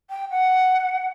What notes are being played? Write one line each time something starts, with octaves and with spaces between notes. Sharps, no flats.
G5
F#5